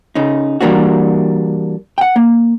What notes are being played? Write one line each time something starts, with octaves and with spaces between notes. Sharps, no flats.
C#3 D#4
E3 G3 A#3 D4 F#4
F#5 G5
A#3